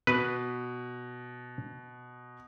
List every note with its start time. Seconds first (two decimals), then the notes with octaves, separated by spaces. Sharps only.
0.07 B2 B4